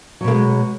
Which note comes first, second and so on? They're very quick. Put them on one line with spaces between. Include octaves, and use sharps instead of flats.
F#3 B2 A#3 G#3